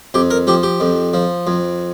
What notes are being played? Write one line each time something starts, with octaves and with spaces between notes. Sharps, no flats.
F2 G4
A#4
F3 G4
G4
F2
F3
F2